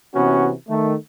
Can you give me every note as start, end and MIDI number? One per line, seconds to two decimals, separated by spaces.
0.15 0.53 48
0.15 0.53 52
0.15 0.53 59
0.15 0.53 61
0.15 0.53 66
0.69 0.95 51
0.69 0.95 57